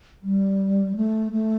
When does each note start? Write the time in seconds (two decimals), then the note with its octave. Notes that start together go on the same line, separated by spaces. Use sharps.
0.23 G3
0.96 A3
1.32 A3